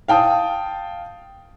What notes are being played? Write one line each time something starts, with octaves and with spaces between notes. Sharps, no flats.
F5 G5 A5 D#6